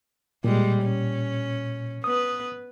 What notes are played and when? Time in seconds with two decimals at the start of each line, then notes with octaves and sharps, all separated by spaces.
0.44 A#2 G3 G#3
0.83 C#4
2.04 B3 B4 D#6